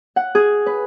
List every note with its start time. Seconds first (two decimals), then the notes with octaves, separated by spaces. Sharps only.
0.16 F#5
0.35 G#4
0.66 B4